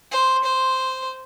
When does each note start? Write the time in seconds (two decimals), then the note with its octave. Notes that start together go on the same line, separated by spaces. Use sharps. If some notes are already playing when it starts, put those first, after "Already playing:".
0.11 C5
0.44 C5